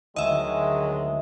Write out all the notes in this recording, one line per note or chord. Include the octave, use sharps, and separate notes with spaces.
D2 D#3 F#3 G#3 D#5 E5